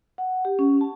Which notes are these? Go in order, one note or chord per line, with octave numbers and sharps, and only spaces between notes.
F#5
G4
C#4
A5